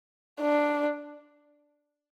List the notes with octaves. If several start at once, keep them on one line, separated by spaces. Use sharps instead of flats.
D4